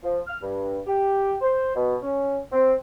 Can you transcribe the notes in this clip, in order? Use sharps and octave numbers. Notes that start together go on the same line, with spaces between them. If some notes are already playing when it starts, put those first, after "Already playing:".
F3
F6
G2
G4
C5
B2
C#4
C4